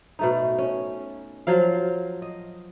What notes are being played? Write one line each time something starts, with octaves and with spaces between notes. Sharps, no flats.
B2 A3 D#4
C#4
F3 F#3 F5
D#5